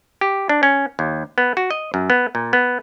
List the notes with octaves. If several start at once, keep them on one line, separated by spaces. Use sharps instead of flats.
G4
D4
C#4
D#2
B3
F#4
D#5
F#2
B3
A#2
B3